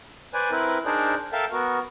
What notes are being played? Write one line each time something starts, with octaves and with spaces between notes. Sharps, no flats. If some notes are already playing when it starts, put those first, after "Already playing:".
B4 C5 D5 G#5
C4 E4 A#4 B4
D4 D#4 G#4 A#4 C5 D5
A4 A#4 E5 F5 G5 A5
B3 F#4 A#4